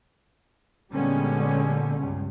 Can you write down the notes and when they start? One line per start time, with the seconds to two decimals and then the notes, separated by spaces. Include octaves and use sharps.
0.92 A#2 D3 G3 G#3 B3 C#4
1.97 C#2 G2